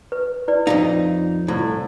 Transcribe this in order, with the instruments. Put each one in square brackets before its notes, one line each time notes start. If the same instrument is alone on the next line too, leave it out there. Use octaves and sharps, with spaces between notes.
[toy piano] B4
E4 B4 D5
[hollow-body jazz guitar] F2 G#2 D#4 [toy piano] F5
[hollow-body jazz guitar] C2 A2 [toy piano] E4